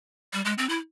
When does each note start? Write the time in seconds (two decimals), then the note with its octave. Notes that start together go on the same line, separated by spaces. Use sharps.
0.33 G3
0.45 G#3
0.58 C4
0.69 E4